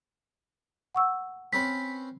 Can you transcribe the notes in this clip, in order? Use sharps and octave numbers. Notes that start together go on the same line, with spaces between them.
F#5 C#6 E6
C4 C#4 B4 B6